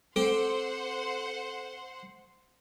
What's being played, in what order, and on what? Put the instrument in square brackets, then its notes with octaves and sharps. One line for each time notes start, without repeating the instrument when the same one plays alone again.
[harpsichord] C4 G5 [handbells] A4 [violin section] C5 F#5 C6